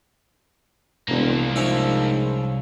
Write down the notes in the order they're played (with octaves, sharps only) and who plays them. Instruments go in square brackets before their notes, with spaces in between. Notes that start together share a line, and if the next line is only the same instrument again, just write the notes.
[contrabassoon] E1 [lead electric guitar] C2 [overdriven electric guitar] A#3 D4
[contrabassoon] G#2 [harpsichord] F3 C#4 E5